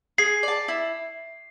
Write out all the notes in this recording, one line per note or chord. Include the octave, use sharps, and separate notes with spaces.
G#4 C7
D5 A5
E4